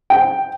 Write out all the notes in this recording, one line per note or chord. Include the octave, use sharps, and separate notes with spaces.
G5